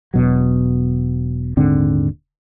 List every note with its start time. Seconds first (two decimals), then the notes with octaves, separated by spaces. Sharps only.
0.14 E1 B2 F#3
1.57 D#1 G#2 D3 C4